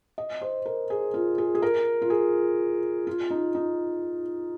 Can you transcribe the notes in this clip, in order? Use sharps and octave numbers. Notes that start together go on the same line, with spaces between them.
D#5
C5
A#4
G#4
F4
G#4
G#4
A#4
F4
G#4
F4
D#4
D#4